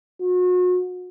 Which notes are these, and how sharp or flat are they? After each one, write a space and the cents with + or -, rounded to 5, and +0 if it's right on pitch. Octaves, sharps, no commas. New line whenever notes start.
F#4 -35